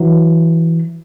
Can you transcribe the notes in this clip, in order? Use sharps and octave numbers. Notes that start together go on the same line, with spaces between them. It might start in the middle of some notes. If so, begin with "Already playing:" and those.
Already playing: E3 F#3